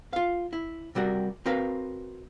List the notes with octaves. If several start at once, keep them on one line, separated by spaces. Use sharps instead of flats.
F4 F5
E4
C3 G3 F#4 A#4
C4 F#4 A#4 B4 F5